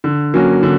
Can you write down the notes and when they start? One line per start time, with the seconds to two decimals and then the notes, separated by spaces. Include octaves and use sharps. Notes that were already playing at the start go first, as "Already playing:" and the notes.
0.04 D3
0.34 F#3 A#3 C#4 F#4
0.63 D3